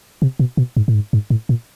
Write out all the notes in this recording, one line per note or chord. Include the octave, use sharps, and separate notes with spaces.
C3
B2
B2
G#2
A2
G#2
G#2
A2
A#2